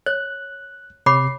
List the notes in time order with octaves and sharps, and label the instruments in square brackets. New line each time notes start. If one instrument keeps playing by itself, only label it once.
[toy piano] C#5 [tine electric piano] F#6
[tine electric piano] C3 C7 [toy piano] C#5 B5 D6